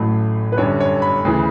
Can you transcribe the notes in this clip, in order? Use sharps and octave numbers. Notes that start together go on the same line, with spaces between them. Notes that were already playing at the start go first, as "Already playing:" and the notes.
Already playing: A1 A2 F#3 A3
B4
G1 F#2 D3 G3 C#5
C#5
B5
D2 C#3 E3